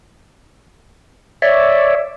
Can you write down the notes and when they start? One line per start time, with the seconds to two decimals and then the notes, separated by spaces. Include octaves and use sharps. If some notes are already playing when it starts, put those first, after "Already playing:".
1.42 C#5 D5 E5